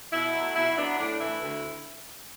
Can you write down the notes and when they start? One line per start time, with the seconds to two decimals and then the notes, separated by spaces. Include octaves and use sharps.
0.13 B2 E4
0.34 F#3 A3
0.55 B2 E4
0.77 F#3 B3 D4
0.98 A2 D4
1.20 E3 A3 E4
1.42 D2